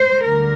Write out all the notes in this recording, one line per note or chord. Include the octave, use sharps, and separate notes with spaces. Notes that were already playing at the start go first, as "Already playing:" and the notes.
Already playing: C5
D2 D3 G3 A#4